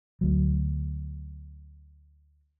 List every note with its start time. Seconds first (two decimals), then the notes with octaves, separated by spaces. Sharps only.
0.21 D2 F#3